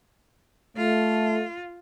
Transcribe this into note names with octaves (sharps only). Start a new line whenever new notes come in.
A3 F4